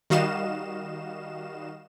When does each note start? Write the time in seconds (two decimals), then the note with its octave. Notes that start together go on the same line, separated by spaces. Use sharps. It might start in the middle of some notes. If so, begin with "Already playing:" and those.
0.10 D#3 G3 F#4 D#5 F5 E7